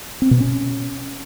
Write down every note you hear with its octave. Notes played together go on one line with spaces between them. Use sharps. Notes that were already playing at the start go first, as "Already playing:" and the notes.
C4
B2
C#4